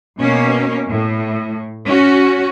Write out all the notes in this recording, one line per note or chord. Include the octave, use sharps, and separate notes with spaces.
B2 A#3 C#4
A2
C#4 F#4